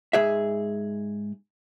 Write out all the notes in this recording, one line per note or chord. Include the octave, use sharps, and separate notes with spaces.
G#2 G#4 E5